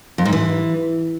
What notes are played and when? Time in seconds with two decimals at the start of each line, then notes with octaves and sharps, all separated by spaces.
0.18 F2
0.25 G#2
0.33 E3